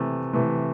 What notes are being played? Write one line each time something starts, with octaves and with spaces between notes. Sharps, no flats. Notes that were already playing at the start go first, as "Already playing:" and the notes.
Already playing: C3 E3 A3
C3 E3 A3